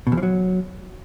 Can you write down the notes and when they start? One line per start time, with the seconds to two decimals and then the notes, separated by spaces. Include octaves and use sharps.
0.07 B2
0.12 E2
0.17 F3
0.23 F#3